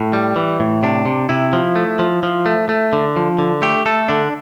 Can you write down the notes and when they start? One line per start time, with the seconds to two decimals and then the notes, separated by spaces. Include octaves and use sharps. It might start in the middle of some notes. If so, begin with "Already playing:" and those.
Already playing: A2
0.13 G3
0.36 E3
0.60 A2
0.83 C3 D4
1.05 C3
1.29 C3 E4
1.53 F3
1.75 A3
1.99 F3
2.23 F3
2.46 A3
2.69 A3
2.93 D3
3.16 F3
3.39 D3
3.62 A3 G4
3.86 A3 A4
4.08 D3 D4